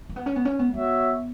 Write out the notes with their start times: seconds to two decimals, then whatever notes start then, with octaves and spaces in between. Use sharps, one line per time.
0.09 A#3
0.16 B3
0.26 C#4
0.36 B3
0.45 C#4
0.59 B3
0.73 B3 F#4 C#5 E5